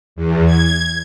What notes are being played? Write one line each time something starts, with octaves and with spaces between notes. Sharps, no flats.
E2
G#6